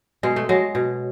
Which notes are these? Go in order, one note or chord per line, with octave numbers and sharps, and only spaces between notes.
B2 G#3
A3
F#3 G#3
B2